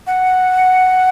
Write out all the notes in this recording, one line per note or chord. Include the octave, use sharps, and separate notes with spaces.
F#5